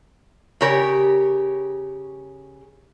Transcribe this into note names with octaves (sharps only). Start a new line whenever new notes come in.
C#3 G4 A#4 C#5